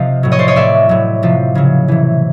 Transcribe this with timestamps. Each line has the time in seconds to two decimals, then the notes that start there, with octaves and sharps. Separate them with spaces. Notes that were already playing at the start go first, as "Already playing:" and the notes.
Already playing: C3 F3 D#5 F5
0.23 A2 F#3
0.32 C#5 D#5
0.39 C5 D5
0.48 C#5 D#5
0.56 A2 F#3 D5 E5
0.89 A2 F#3
1.23 C3 F3
1.55 C#3 F#3
1.88 C3 E3